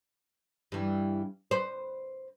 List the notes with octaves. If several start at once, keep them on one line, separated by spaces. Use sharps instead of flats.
G2 E3
B4 C5